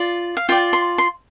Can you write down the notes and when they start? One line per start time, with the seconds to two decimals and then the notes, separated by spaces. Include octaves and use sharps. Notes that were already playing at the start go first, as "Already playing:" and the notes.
Already playing: F4 D5
0.37 F5
0.49 F4 G5
0.52 D5
0.73 C6
0.98 C6